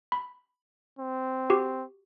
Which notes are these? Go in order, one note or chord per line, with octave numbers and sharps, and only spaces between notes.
B5
C4
F#4 G4